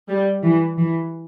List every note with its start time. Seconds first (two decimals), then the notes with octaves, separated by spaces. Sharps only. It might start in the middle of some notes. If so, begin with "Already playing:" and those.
0.09 G3
0.43 E3
0.77 E3